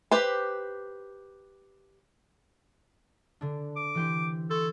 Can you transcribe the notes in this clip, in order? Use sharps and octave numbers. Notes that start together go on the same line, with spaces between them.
G4 B4 C5
D3 D4
D6
E3 G4 C5
A4 C6 C#6 G#6